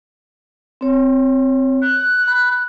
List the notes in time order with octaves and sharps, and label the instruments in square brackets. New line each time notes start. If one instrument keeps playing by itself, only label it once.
[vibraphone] C4 C#5
[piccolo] F#6
[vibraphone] B5